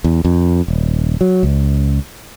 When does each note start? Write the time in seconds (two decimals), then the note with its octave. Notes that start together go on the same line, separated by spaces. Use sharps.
0.04 E2
0.25 F2
0.68 D#1
1.21 F#3
1.43 C#2